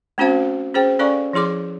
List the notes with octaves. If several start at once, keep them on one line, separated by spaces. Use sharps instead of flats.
A3 C4 C#4 F#4 C5 F5
C#4 G#4 C5 G5
C#4 A4 D5 F5 G#5 C#6
F3 E4 G#4 C6 D6